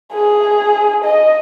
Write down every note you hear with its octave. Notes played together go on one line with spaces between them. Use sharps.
G#4
D#5